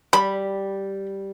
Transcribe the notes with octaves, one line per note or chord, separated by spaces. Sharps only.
G3 B5